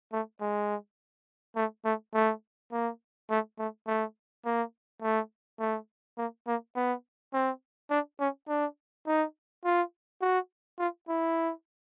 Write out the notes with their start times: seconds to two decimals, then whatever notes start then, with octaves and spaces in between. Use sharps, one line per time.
0.12 A3
0.41 G#3
1.56 A3
1.85 A3
2.14 A3
2.72 A#3
3.30 A3
3.59 A3
3.87 A3
4.45 A#3
5.02 A3
5.60 A3
6.17 A#3
6.47 A#3
6.76 B3
7.33 C4
7.91 D4
8.20 C#4
8.48 D4
9.07 D#4
9.64 F4
10.21 F#4
10.79 F4
11.08 E4